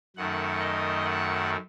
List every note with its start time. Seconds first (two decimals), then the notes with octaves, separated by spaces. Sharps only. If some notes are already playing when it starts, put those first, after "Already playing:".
0.16 F#2 D#3 A3 F#5
0.60 D#5
1.05 F#5